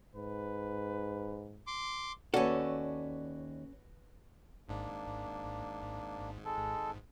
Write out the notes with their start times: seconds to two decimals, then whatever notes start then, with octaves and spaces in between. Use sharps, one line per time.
0.15 G#2 B4
1.67 C6 D6
2.34 D#2 C#4 F#4 A4 B4 D5
4.69 G#1 G#2 A#3 D4
6.45 G#3 A4